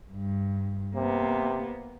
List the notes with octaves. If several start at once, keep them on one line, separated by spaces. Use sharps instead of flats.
G2
C3 A#3 B3